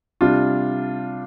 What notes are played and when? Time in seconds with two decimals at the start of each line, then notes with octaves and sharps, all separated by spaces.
0.21 C3 G3 D4 F4